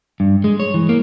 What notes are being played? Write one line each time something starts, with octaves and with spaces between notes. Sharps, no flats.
G2
G#3
C#5
E3
A#3